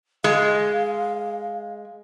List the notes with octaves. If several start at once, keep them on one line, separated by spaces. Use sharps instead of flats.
G#3 F5